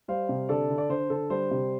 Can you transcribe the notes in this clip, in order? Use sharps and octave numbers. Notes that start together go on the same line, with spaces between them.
G3 C5 F5
C3
D3 A4 D5
D3
D5
D3 C5
D3 A4
G3 C5
C3